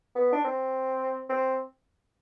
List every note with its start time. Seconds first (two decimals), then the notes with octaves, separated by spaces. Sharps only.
0.15 B3
0.32 D4
0.44 C4
1.29 C4